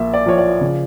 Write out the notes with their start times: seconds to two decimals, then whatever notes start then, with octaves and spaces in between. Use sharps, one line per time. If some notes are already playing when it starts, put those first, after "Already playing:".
Already playing: A#1 A#3 E5
0.14 D5
0.26 F3 C#5
0.38 D5
0.61 C#3